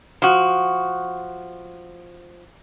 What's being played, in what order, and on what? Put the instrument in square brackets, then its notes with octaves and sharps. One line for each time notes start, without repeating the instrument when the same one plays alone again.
[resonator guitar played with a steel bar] F3 F#4